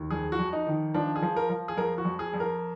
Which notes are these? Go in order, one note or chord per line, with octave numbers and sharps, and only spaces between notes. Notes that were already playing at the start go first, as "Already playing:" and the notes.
Already playing: D#2
F2 G#4
F#4
F2
D#4
D#3
F3 D4
G#4
F3
A#4
F3
G#4
F2 A#4
F#4
F2
G#4
F2
A#4